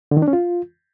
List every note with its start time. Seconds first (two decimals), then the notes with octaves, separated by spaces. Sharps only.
0.11 D3
0.17 D#3
0.22 D4
0.28 C#4
0.33 F4